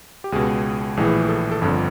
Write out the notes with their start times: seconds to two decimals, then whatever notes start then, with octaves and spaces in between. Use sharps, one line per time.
0.24 G4
0.32 C#2 B2 G#4
0.97 A#1 A2 E3 G#4
1.29 A4
1.51 A4
1.61 G1 F2 D3